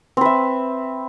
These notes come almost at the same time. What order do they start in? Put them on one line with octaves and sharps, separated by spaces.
C4 B4 E5